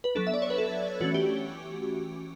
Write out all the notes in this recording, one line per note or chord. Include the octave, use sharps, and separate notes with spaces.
B4
F#3 B3 D4 A4
E5
D5
C#5
B4
A4
E3 A3 C#4 F#4
G4